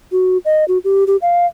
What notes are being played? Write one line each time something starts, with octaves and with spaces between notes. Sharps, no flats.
F#4
D#5
F#4
G4
G4
F5